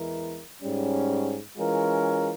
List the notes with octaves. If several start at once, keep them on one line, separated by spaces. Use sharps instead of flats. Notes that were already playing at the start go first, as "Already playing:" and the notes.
Already playing: E2 E3 G#3 E4 A#4
G#2 G3 C#4
E3 G#3 C#4 F4 A#4